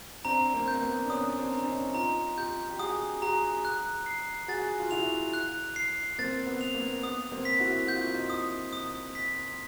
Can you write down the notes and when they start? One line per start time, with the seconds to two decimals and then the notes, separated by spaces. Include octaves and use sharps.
0.25 C4 D4 A#5
0.54 A#3 C4
0.68 G6
0.75 A#3
0.82 B3
1.05 D4
1.10 B3 C#4 D#6
1.38 C4 D4
1.52 A#5
1.66 C#4 D#4
1.94 D#4 F4 A#5
2.37 F4 G4 G6
2.71 G4
2.79 F#4 G#4 D#6
3.22 F#4 G#4 A#5
3.65 F#6
4.06 C7
4.48 F#4 G#4 A6
4.79 F4
4.91 E4 F#4 F7
5.33 F#6
5.76 C7
6.18 A#3 C4 A6
6.46 B3
6.61 F7
6.74 A#3
7.03 B3 D#6
7.32 A#3 C4
7.45 B6
7.60 E4 F#4
7.87 F#4 G6
7.96 F4
8.06 E4
8.14 D#4 F4
8.30 D#6
8.73 D#6
9.15 B6